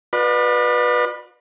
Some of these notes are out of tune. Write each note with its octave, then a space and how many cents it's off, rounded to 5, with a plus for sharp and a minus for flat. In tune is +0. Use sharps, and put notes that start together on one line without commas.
F4 +45 B4 -10 D5 +40